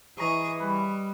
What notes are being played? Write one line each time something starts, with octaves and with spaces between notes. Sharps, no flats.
E3 G#4 D#5 A#5 C#6
G3 B4